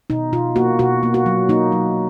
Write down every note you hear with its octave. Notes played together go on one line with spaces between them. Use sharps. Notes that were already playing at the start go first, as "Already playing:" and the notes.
B2 D#4
B2 F4
A#3 F#4
B2 F#4
A#3
F#4
F#3
A#3 D#4
F#3